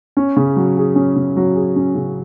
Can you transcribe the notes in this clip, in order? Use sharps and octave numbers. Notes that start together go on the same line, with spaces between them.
C#4
C#3
F#3
G#4
C#4
C#3
F#3
G#4
C#4
C#3